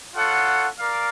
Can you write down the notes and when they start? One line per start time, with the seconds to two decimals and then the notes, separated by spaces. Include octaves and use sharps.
0.15 F4 A4 C#5 F#5
0.80 A#4 D5 F5